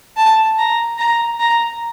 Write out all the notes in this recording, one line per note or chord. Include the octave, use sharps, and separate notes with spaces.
A5
A#5
A#5
A#5